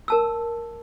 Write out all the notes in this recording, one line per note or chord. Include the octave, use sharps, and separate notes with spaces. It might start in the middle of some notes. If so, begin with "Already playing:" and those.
A#4 A5 E6